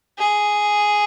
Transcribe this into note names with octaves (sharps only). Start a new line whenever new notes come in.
G#4